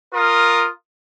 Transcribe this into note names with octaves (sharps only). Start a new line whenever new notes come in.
F4 A#4 D#6